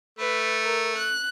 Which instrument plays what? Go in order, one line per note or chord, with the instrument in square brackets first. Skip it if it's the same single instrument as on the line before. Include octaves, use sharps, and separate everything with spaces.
[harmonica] A3 [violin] B4
[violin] A#4
F#6